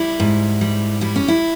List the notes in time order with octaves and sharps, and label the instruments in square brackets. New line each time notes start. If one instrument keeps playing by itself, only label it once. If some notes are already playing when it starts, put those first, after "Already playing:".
Already playing: [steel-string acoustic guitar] G3 E4
G#2
G3
G3 E4
C#4
E4